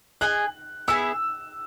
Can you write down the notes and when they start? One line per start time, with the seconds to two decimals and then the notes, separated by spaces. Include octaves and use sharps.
0.21 G#4 D#5 G#5 F#6
0.88 B3 E4 G#4 E6